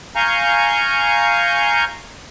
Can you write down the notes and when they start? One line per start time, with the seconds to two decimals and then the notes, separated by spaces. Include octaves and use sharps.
0.16 F5 G#5 A#5 C#6 G6